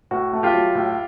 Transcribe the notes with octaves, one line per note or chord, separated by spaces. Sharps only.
A2 F#4
A3
F4 G4
F#3
A2